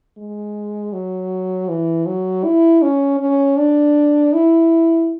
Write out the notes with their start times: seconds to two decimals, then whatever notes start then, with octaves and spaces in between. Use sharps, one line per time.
0.18 G#3
0.93 F#3
1.69 E3
2.06 F#3
2.44 E4
2.82 C#4
3.20 C#4
3.57 D4
4.33 E4